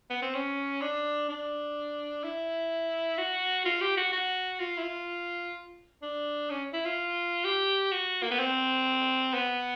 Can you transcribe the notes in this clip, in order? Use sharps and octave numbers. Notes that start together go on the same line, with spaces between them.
B3
C4
C#4
D4
D4
E4
F#4
F4
G4
F#4
F#4
F4
E4
F4
D4
C#4
E4
F4
G4
F#4
A#3
B3
C4
B3